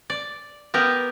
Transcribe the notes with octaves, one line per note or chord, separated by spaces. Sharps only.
D5
B3 G4 A#4